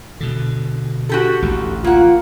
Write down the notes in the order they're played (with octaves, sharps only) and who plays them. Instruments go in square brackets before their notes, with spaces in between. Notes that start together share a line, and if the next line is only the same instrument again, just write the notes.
[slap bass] B2 D3
[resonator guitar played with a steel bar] F#4 G4 A4
[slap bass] A1 D2
[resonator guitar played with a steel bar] A#3 F#5 [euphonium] F4